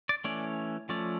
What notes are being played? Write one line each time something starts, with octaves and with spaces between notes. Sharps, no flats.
D5
E3 A3 C#4 D5
F3 A3 C#4 D5